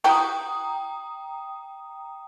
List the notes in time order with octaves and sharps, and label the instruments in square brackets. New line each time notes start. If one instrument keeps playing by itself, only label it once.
[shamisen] E4 F#4 G4 [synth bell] G5 A#5 D#6